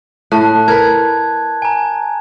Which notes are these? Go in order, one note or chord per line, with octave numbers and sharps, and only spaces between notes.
A2 A5 F#6
A#4 B4 G#6
G#5 A#5